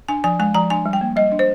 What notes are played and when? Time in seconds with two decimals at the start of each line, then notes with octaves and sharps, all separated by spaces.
0.08 D4 G#5
0.24 F3 G#5
0.39 G#3 G#5
0.55 F3 A#5
0.70 D4 G#5
0.86 G3
0.93 G5
1.01 A#3
1.16 G3 D#5
1.32 D4
1.39 C5